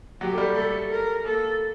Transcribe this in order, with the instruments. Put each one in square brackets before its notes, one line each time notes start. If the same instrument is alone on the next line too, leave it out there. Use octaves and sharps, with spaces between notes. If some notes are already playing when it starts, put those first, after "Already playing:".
[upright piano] F#3 [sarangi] G4
[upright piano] A3
G3
[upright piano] A3 [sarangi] A4
[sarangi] A#4
[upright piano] A#3 [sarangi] A4